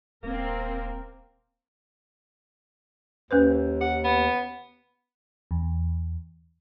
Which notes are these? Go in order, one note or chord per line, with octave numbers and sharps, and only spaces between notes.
D#1 A#3 C4 A#4
D#2 C#4 B4 C5
G4 F#5
B3
E2